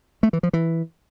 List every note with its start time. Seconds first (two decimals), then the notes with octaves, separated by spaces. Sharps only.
0.23 A3
0.33 E3
0.43 F3
0.53 E3